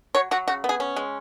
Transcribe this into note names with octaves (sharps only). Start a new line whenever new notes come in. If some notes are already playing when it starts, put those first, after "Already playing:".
F#3 C#5
F#3 F#4
C#3 F#4
B3
G#4
C#4
G#3